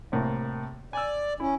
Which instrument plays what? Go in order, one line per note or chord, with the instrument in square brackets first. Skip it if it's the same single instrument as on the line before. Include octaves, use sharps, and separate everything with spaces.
[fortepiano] C2 A2 A#3
[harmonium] D5 [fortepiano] G#5 E6
[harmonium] C#4 [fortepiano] E4